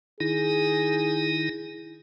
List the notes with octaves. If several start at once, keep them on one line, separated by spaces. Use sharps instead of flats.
D#3 D#4 E4 G#4